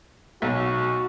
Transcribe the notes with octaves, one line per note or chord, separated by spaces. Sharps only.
B1 F#4